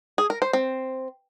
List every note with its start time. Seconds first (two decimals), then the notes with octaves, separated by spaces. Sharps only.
0.18 G#4
0.30 A#4
0.42 C5
0.53 C4